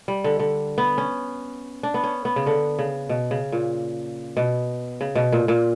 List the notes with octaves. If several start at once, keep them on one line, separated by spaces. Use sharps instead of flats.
G3
D3
D3
B3
C#4
D4
B3
C#4
B3
C#3
D3
C#3
B2
C#3
A#2
B2
C#3
B2
A#2
A#2